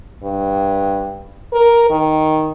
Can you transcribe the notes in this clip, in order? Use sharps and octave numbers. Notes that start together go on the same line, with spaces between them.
G2
A#4
D#3